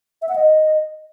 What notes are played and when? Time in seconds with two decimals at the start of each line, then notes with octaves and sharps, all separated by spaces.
0.22 E5
0.29 F#5
0.35 D#5